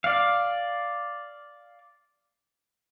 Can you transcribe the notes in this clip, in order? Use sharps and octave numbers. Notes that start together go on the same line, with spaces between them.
D5 F5